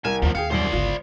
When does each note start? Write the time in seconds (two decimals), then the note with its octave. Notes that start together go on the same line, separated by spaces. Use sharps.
0.05 C2 A#4 G#5 E7
0.22 D#2 F3 F#3
0.35 D#2 G#4 F5 G5 C#7
0.50 E1 C2 F#2 C5 D5
0.73 G1 C#2 F4